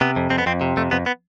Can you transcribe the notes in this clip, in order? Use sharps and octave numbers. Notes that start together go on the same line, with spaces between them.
C3 B3
F2
F2 C4
B3
F2 C4
C3
F2 A3
F2 B3
B3